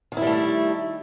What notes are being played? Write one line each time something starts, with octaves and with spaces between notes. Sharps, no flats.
D#3 G3 A3 E4